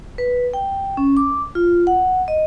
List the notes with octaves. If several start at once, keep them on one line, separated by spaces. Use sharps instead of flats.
B4
G5
C#4
D6
F4
F#5
D#5